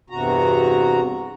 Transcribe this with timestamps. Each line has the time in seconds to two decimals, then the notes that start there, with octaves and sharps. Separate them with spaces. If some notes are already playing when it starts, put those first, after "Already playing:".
0.10 E2 G2 C3 F#4 A#5